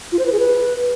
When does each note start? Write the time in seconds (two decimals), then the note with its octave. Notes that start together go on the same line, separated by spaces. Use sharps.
0.12 F4
0.19 C5
0.26 B4
0.33 G#4
0.39 B4